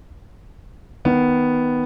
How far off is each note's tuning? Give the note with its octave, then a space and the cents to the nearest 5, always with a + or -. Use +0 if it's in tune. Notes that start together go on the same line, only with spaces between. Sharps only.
D#3 +0 B3 +0